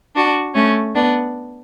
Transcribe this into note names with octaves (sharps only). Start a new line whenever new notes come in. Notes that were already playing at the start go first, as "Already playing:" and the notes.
D4 F#4
A3 C#4
B3 D4